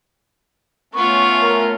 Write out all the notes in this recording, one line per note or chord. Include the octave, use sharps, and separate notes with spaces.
A3 B3 C#4 F4 C#6
A#4